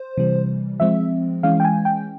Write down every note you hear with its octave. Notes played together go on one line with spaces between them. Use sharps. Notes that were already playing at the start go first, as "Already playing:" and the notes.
Already playing: C5
C3 E3 G3
F3 G#3 C4 E5
E3 G#3 C#4 F5
G5
G#5
G5